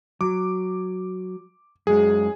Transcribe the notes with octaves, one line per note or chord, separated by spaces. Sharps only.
F#3 D6
F#2 G#3 G#4